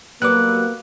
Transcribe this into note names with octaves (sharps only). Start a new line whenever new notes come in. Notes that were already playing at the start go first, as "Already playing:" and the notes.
F#3 G3 A#3 B3 B4 D6 F#6